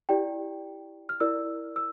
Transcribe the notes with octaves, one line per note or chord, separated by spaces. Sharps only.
E4 G4 D5 G5
F6
E4 A#4 D5 E6
E6